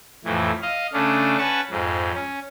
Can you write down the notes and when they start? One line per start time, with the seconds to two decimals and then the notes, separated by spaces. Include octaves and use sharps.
0.25 F2 A2 E3
0.62 D#5 F5
0.93 C#3 A3 C#4 D4
1.38 C#4 B4 F#5 A5 C#6
1.71 F2 G#2
2.14 C#4